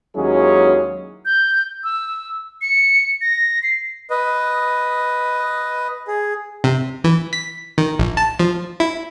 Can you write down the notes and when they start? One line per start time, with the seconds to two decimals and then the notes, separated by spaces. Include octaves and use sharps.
0.15 D#2 F#3 G#3 C#4 E4 G#4
1.25 G6
1.84 E6
2.61 C#7
3.21 A#6
3.63 C7
4.10 B4 D#5
6.08 G#4
6.64 C3
7.04 E3
7.33 B6
7.78 D#3
7.99 A#1
8.17 A5
8.39 F3
8.80 E4